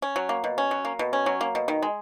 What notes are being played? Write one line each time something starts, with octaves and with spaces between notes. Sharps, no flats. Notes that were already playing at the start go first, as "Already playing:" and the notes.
C#4
F#3
A#3
B2
C#4
F#3
A#3
B2
C#4
F#3
A#3
B2
D#3
G#3